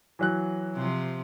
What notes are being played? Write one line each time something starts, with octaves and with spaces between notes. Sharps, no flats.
E3 F#3 F#6
C3 F3